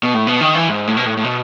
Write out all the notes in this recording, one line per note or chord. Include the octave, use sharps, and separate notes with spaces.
B2
A2
B2
D#3
E3
G#2
A2
B2
A2
A2
B2